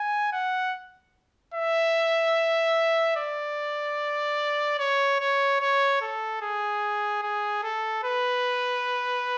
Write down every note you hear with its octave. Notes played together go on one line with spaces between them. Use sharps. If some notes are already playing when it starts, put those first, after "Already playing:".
Already playing: G#5
F#5
E5
D5
C#5
C#5
C#5
A4
G#4
G#4
A4
B4